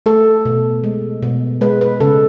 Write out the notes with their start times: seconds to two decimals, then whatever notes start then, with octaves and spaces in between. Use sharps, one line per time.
0.06 A3 A4
0.45 B2
0.84 G#3
1.22 B2
1.61 G#3 B4
1.81 B4
2.00 C#3 A4